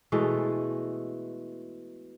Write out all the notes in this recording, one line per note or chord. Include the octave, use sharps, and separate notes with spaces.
B2 E3 G#3 A3